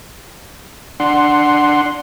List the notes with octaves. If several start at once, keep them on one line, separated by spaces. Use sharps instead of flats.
D4 F#5 C6